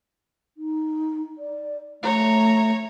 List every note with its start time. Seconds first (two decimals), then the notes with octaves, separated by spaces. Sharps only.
0.57 D#4
1.38 D5
2.03 A3 C#5 A#5